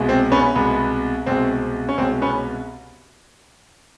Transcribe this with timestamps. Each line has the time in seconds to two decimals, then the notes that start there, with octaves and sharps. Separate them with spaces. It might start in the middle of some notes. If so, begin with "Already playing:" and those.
Already playing: C2 B2 G#3
0.09 C4
0.32 B3 C#4
0.55 C2 B2 G#3 B3
1.26 C2 B2 G#3 C4
1.89 C#4
1.97 C2 B2 G#3 C4
2.22 B3 C#4